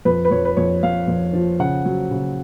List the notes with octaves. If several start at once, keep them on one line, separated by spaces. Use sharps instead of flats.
F2 B4
B4
F2 C#5
B4
F2 C#5
F2 F5
F2
F3
C#3 F#5
F#3
C#3